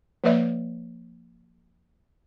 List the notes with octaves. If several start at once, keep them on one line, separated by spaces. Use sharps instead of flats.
F3 A#3 B4 D5 E5